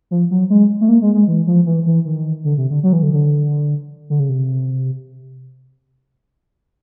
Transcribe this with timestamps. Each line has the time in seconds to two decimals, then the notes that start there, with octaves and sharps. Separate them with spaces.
0.11 F3
0.31 F#3
0.50 G#3
0.81 A3
0.89 A#3
1.02 G#3
1.15 G#3
1.27 E3
1.47 F3
1.66 E3
1.86 E3
2.05 D#3
2.44 D3
2.57 C3
2.70 D3
2.83 F#3
2.93 E3
3.03 D3
3.13 D3
4.10 D3
4.20 C#3
4.29 C3